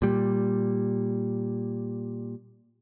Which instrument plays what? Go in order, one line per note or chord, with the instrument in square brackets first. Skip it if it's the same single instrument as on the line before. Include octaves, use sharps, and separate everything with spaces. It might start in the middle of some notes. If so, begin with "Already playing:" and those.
[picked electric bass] A#2 G3